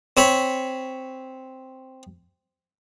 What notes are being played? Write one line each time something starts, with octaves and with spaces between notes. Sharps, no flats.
C4 C#5 B5